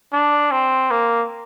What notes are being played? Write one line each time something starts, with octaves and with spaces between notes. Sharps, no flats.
D4
C4
A#3